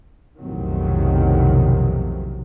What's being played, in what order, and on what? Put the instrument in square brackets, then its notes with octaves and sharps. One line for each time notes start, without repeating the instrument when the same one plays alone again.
[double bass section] B1 F2 A2 C3 D#3 F#3